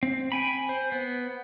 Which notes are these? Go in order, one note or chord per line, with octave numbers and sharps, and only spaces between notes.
C4
G5 G#5 B5
C5
B3